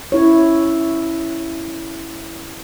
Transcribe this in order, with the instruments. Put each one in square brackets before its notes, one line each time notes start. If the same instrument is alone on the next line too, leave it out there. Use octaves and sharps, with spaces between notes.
[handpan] C#4 E4 C#5